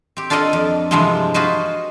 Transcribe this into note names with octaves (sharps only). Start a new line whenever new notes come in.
C4 G4
D4 F4 A4 A#4 D#5 F#5
F2
G2 C3 E3 F3 G#3 C4
F4 F#4 G#4 B4 C5 D#5